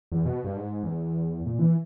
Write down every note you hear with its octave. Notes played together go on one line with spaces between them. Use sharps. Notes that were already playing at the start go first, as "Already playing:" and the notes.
E2
B2
G2
G#2
E2
A#2
E3